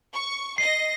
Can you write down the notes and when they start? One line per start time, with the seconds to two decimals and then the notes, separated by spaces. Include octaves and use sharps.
0.14 C#6
0.58 D#5 A#6 C7